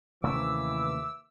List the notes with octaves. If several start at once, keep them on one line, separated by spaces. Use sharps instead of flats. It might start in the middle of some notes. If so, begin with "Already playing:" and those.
D#2 C3 E3 A3 C#4 E5 D6 E6